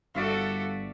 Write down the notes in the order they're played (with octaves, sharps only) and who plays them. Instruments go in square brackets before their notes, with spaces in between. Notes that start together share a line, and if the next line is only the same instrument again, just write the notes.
[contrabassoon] G1 [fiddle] F#4 A4 [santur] D5 E5 F5